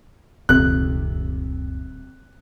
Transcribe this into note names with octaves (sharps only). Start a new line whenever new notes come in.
D#1 C#2 F#2 C3 F#6